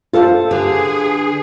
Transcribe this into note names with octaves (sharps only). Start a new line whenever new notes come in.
F4 A4 C5 F5
D3 G4 G#4 B4